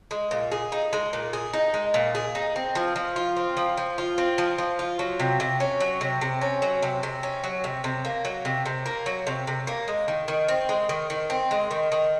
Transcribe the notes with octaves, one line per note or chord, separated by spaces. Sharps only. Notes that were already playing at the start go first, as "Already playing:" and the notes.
G#3
A#2
G#4
D#4
G#3
A#2
G#4
D#4
G#3
A#2
G#4
D#4
C4
F3
F3
F4
C4
F3
F3
F4
C4
F3
F3
F4
F#3
C3
C3
C#4
F#3
C3
C3
C#4
F#3
C3
C3
C#4
F#3
C3
C3
A#3
F#3
C3
C3
A#3
F#3
C3
C3
A#3
G#3
D#3
D#3
C4
G#3
D#3
D#3
C4
G#3
D#3
D#3